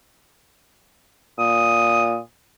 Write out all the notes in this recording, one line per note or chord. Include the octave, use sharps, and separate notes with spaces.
A#2 D#6